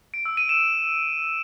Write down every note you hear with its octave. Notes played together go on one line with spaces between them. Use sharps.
D7
E6
D#7
E7